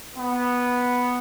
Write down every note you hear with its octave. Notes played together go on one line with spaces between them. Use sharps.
B3